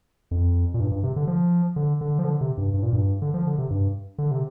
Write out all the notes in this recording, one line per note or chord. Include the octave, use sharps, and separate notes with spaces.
F2
A#2
G2
G2
C3
D3
F3
D3
D3
F3
D3
C3
G2
G2
A#2
G2
D3
F3
D3
C3
G2
D3
C3